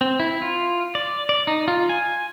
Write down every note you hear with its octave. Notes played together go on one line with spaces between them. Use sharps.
C4
E4
F4
D5
D5
D#4
F4
G#5